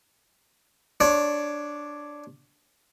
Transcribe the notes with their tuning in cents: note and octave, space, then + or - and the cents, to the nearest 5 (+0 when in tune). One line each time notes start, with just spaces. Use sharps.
D4 +0 C#5 +5 C#6 -40